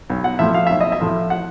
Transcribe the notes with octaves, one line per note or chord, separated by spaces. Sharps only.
B1
F#5
A2 F3 A3 E5
F5
B1 E5
D#5
E5
A2 F3 A3
F#5